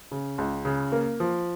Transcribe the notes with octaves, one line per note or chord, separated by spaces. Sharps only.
C#3
C#2
C#3
A#3
F3